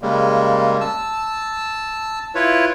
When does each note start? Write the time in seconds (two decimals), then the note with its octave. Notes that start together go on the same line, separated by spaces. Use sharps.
0.01 C#3 G3 G#3 A#3
0.81 A5 E6
2.35 E4 F4 B4 C#5